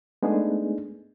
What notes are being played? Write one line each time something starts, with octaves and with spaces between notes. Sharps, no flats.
G#3 A3 B3 D4 D#4 G#4